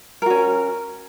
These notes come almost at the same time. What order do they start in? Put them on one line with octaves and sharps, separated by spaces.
A#4 F#4 C#4